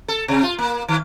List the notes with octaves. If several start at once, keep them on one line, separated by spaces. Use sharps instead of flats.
A4
C3
F4
A#3
D#3